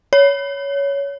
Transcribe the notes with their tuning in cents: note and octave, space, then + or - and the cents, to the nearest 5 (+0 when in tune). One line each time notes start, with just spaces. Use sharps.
C#5 +15